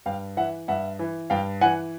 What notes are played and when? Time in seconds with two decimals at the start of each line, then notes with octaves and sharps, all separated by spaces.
0.06 G2 F5 G5
0.37 E3 E5 F#5
0.68 G2 E5 F#5
0.99 E3
1.30 G2 F5 G5
1.61 E3 F#5 G#5